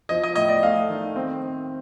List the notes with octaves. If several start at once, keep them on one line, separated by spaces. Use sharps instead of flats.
F3 D#5
D#5
A2 D#5
D5
A3 F5
D#3
C4
C4